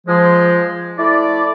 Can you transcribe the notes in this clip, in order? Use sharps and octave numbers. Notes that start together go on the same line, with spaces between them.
F3 G#3
A3 E4 D5